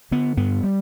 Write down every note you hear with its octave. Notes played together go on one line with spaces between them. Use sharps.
D3 B3
G2 B3
G3